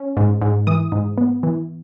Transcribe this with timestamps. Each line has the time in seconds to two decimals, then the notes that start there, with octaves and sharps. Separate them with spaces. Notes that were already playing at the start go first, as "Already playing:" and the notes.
Already playing: C#4
0.17 G#2
0.42 G#2
0.67 E3 D#6
0.92 G#2
1.18 B3
1.43 E3